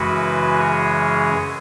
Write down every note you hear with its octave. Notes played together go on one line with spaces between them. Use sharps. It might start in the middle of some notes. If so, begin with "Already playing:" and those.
Already playing: F#2 C#3 E3 G#3 F#4 B4
G#4 C#5